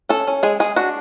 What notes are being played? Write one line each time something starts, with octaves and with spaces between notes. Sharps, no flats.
C#4 A4
C#4
G#3 G#4
G#3 G#4
D4 F#4